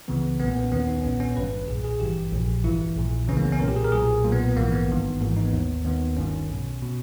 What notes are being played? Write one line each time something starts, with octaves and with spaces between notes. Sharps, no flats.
C#2 C#3 E3 B3
B1 A#2 B3
A#3
B3
C#4
D#2 D#3 B3
C#4
D#4
C#4
B1 A#2 B3
C#4
G#1 G2 D#3 B4
B1 A#2 G#4
G#4
G#1 G2 E3 G4
A#1 A#2
G1 G2 E3 E4
A#1 A#2
C#2 C#3 E3 C#4
A#3
B3
C#4
B1 A#2 A#4
G4
G#4
A#4
B1 A#2 G#4
B1 A#2 A#3
B3
B3
A#1 G#2 E3 A#3
B3
G1 G2 D#3
G#1 G#2 E3 A#3
D#4
B3
D#2 D#3
D#2 D#3 B3
G1 G2 D#3 C#4
B1 B2
B2